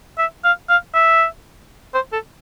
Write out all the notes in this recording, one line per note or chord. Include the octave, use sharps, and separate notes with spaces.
E5
F5
F5
E5
C5
A4